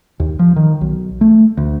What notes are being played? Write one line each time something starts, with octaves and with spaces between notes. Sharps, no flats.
D#2
F3
D#3
B1
A3
D2